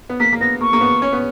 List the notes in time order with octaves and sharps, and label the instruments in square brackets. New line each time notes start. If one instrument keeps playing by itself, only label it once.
[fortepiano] B3
[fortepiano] A#3 [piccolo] B6
[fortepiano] A#3
[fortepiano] B3 [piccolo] A#6
[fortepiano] A#3 [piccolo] C#6
[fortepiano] A#3
B3
C#4
B3